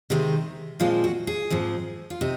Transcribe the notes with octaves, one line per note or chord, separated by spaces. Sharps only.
C3 D#3 G#3 C4
A#2 F3 G#3 C4 F4
F#4
G#4
G#2 F3 C4
F4
C3 D#4